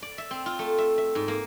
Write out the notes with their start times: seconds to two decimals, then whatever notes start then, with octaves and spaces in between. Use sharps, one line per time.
0.02 D5
0.18 E5
0.31 C4
0.46 F4
0.59 A3
0.78 E5
0.98 E5
1.15 G#2
1.28 A#3